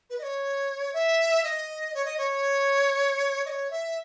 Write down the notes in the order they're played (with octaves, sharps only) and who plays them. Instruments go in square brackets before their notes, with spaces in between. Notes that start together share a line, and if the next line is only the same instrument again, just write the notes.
[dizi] B4
D#5
C#5
E5
D#5
C#5
D#5
C#5
D#5
C#5
E5